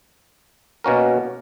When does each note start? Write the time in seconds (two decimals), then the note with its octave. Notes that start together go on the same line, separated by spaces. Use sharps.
0.84 B2 A#3 C#4 F#4 A#4